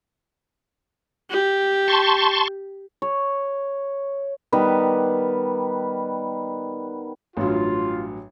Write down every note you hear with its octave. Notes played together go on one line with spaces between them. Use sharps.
G4
A5 C6 C#6
C#5
D#3 G3 B3
A1 G2 F#3 F4